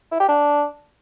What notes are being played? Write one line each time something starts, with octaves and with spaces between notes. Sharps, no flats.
E4
G4
D4